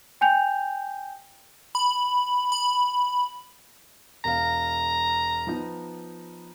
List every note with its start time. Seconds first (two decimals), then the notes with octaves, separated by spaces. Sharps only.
0.21 G5 G#5 G6 F7
1.75 B5
2.52 B5
4.24 E1 F5 A#5
5.47 F3 B3 D#4